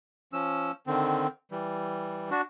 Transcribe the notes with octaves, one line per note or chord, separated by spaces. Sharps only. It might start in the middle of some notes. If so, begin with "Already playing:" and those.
F3 C#4 E6
D3 D#3 C4
E3 G3
D4 F#4